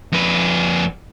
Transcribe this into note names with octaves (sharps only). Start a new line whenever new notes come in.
F2 B4